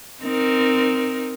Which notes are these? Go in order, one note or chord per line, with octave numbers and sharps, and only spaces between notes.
C4 D#4 A#4